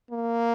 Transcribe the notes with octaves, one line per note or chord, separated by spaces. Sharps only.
A#3